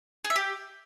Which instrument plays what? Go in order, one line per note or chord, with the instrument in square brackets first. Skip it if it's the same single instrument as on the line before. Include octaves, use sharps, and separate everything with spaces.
[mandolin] G#4
E5
G4